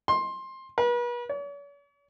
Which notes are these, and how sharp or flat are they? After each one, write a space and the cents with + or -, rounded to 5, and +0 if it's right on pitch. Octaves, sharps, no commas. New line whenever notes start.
C6 +15
B4 -40
C#5 +45